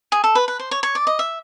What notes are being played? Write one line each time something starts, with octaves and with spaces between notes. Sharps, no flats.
G#4
A4
B4
B4
C5
C#5
C#5
D5
D#5
E5